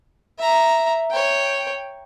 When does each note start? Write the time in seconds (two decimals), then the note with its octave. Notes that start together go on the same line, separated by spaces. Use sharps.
0.39 E5 A#5
1.11 C#5 G5